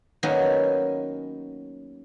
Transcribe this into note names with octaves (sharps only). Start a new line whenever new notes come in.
D#3 F#3 A#3 B3 C#4